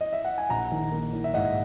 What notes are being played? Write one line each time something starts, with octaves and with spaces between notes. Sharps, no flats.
D#5
E5
F#5
G#5
A#1 F#5 A#5
D#3
A#3
D#3
E5
G#2 D#5 F#5